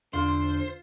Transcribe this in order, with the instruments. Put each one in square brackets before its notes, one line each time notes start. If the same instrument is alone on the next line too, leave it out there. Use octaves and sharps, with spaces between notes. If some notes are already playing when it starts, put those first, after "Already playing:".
[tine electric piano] E2 [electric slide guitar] D3 [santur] F4 [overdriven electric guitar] C5